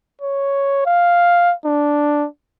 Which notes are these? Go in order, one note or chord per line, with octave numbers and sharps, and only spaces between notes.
C#5
F5
D4